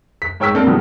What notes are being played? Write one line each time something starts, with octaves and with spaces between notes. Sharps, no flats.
B6
G#2 C#5 G5 E6 B6
A#3 C4 D4 A4 A#4
G2 B2 D#3 F3 G#3